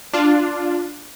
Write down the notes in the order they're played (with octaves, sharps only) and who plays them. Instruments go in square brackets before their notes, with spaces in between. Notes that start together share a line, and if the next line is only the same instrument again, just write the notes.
[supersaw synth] D4 F4